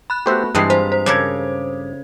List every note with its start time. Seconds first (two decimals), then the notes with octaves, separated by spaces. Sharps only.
0.10 B5 F#6
0.26 A3 B3 F#4 G4 C5 E5
0.55 G2 E3 G#3 C4 G#4 A5 D#6 C7
0.70 F4 C5
0.92 C5
1.06 C#3 A4 A#4 D6 G#6